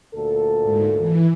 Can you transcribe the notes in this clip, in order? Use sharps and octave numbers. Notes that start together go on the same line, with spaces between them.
D2 A#2 A4
G#2
E3